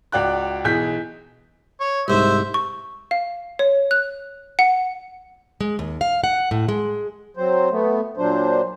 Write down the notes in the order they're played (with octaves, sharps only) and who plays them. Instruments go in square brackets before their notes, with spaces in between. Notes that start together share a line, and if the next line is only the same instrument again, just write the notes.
[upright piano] C#2 F#4 D5 G5 F#6
B1 E3 G#4 G6 B6
[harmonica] C#5
[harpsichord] C2 G#2 [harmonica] C5 E5
[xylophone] C#6
F5
C#5
F#6
F#5
[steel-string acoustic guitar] G#3
D#2
F5
F#5
A2
G#3
[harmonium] F#3 C4 C5
A3 B3
A#2 F#3 D4 C5